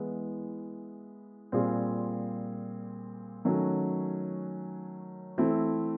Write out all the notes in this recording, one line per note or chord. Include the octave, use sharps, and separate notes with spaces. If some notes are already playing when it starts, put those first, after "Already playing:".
Already playing: E3 G#3 B3 E4
A#2 G3 C4 F4 G#4
D#3 F#3 A3 C#4 F#4
E3 A3 C4 E4